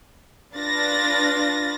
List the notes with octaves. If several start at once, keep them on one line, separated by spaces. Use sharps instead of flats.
D4 F4 B4 A6 A#6